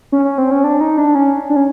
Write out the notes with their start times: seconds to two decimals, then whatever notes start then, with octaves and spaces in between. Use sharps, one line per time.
0.12 C#4
0.25 C#4
0.38 C4
0.51 C#4
0.64 D4
0.81 D#4
0.98 D4
1.15 C#4
1.50 D4
1.56 C#4